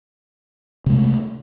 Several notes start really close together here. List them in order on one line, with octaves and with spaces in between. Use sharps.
C3 G#3 A3